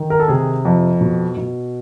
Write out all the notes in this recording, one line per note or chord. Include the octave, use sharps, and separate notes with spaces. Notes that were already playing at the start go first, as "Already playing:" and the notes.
Already playing: D#3
A#4
A4
C3 G#4
F2
B2
B2